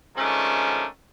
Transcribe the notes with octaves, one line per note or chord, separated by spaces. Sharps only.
D#3 F3 G#3 A3 C#4 D4